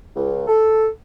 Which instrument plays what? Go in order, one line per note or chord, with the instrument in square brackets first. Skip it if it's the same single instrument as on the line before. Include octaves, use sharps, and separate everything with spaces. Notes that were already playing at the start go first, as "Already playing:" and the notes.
[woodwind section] C#2
A4